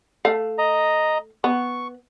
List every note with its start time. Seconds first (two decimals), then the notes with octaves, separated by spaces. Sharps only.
0.25 A3 F5
0.58 D#5 A#5
1.44 B3 C#6